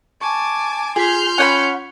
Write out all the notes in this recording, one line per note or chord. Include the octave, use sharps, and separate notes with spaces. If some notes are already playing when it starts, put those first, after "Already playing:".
G#5 A5 C#6 D6
F4 G#4 G#5 C6 F6 G6 B6
C#4 F#5 G5 B5